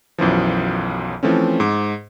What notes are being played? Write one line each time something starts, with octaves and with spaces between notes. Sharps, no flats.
B1 F#2 E3 F3
E3 F3 A3 C4 C#4
G#2 D6